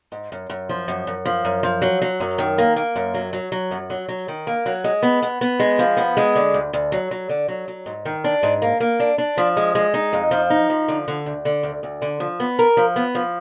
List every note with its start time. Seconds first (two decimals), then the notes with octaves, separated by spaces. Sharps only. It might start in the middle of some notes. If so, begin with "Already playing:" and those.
0.12 G#2
0.32 F#2
0.50 F#2
0.69 F3
0.88 F#2
1.07 F#2
1.25 F3
1.45 F#2
1.63 F3
1.82 F#3
2.01 F#3
2.20 F#2
2.38 D#3
2.58 A#3
2.76 A#3
2.96 F#2
3.14 F#3
3.33 F#3
3.52 F#3
3.71 F#2
3.90 F#3
4.08 F#3
4.28 D#3
4.47 A#3
4.66 F#3
4.84 G#3
5.03 B3
5.23 B3
5.41 B3
5.60 G#3
5.79 F3
5.97 B3
6.17 G#3
6.35 D3
6.54 D2
6.73 D2
6.92 F#3
7.11 F#3
7.29 D3
7.48 F#3
7.68 F#3
7.86 G#2
8.05 D#3
8.24 D4
8.43 G#2
8.62 A#3
8.80 A#3
9.00 D4
9.18 D4
9.38 F3
9.57 G#3
9.75 G#3
9.94 D#4
10.13 F2
10.31 F3
10.50 D#4
10.70 F3
10.88 D3
11.08 D3
11.26 D2
11.45 D3
11.63 D2
11.83 D2
12.02 D3
12.20 F3
12.40 B3
12.59 A#4
12.77 F3
12.96 B3
13.15 F3